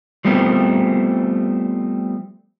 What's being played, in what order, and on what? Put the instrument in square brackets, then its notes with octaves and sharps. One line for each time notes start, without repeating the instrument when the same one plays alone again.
[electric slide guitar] F3 G3 A3 B3 C4